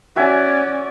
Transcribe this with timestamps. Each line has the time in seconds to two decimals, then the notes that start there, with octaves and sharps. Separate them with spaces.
0.16 C#4 F#4 D5 E5 G#5